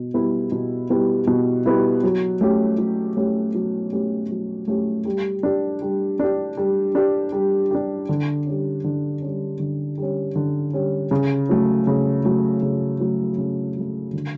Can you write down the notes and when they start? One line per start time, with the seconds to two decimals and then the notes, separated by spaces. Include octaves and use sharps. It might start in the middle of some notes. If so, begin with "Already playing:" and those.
Already playing: B2
0.14 G3 B3 E4
0.52 B2
0.90 G3 B3 E4
1.27 B2
1.66 G3 B3 E4
2.03 F#3
2.41 A3 C#4 G4
2.78 F#3
3.17 A3 C#4 G4
3.54 F#3
3.93 A3 C#4 G4
4.31 F#3
4.68 A3 C#4 G4
5.05 G3
5.43 D4 G4
5.82 G3
6.19 D4 G4
6.57 G3
6.95 D4 G4
7.32 G3
7.71 D4 G4
8.09 D3
8.46 G3 C#4
8.84 D3
9.22 G3 C#4
9.59 D3
9.98 G3 C#4
10.36 D3
10.73 G3 C#4
11.11 C#3
11.49 F#3 A3
11.87 C#3
12.25 F#3 A3
12.62 C#3
13.00 F#3 A3
13.38 C#3
13.76 F#3 A3
14.13 D3